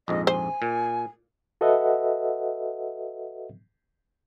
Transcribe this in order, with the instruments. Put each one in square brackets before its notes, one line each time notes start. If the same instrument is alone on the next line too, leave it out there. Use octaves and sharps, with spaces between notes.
[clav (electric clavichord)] A#1 F2 G#2 [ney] D#5
[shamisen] C5 [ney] G#5
[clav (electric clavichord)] A#2
[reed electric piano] F#4 A4 B4 D#5 E5 F#5